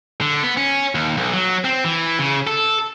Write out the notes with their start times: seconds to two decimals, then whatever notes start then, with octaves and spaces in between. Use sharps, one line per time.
0.21 D3
0.43 B3
0.57 C#4
0.95 D#2
1.17 B1
1.33 F#3
1.65 C4
1.84 E3
2.19 C#3
2.47 A4